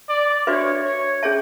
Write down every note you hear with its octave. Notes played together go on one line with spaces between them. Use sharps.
D5
D4 F#4 B4 C#5 E5
C#5
C#4 G#4 C#5 E5 A5